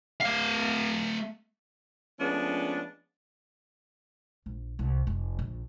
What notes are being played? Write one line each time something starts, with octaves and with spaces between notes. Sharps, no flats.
A3 F5
F3 G#3 A3 B3 C#4 D4
A#1
C2
F1
A#1